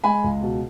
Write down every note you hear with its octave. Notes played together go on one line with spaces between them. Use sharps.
G#3 G#5 B5
C#2
B2